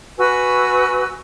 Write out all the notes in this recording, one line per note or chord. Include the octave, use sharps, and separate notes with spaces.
F#4 B4 G#5 E6